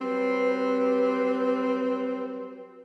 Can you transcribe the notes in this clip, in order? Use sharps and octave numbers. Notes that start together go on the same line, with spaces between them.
F#3 G3 C4 B4